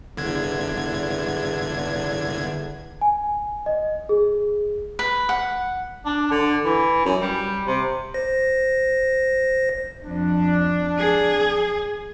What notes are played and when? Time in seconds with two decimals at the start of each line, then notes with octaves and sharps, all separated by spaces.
0.17 G1 E2 D3 G#6
3.01 G#5
3.66 D#5
4.09 G#4
4.99 B4
5.29 F#5
6.05 D4
6.31 D3
6.65 E3
7.05 F#2
7.21 G3
7.67 C3
8.14 C5 A#6
10.04 F2 D4
10.99 G#4